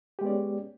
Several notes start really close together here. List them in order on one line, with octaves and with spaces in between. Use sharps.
G4 G#3 B3 D5 C#4